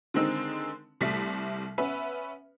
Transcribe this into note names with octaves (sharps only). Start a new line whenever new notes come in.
D3 D#3 G#3 C4 D#4
C2 C3 G3 A3 B6
B3 C#4 B4 E5